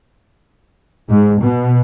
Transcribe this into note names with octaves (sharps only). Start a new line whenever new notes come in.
G#2
B2